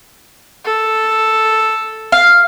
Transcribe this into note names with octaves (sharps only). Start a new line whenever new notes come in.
A4
F5